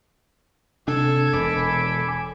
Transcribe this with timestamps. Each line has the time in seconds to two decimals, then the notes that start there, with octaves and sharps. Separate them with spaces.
0.88 C3 D4 A4 G#6
1.33 E1 G#5 B5 D6